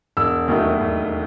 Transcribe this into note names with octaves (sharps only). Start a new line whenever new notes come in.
E1 E6
D#2 D#3 F#3 A3
E1